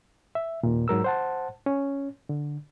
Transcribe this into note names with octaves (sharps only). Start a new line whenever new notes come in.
E5
D#2 A#2
G#2 F#3 A#4 E6
C5 F#5 A5
C#4
D3